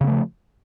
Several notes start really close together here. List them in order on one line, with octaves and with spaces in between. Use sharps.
C#3 C4 A3 F3